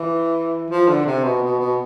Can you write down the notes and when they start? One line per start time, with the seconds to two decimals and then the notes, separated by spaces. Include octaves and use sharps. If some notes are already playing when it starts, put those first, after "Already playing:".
Already playing: E3
0.70 F3
0.89 D3
1.06 C3
1.24 B2
1.42 B2
1.59 B2